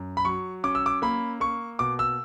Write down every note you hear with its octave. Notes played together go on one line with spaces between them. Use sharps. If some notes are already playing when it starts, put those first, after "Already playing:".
Already playing: F#2
B5
F#3 C#6
C#4 D6
E6
D6
A#3 B5
A#3 C#6
B2 D6
E6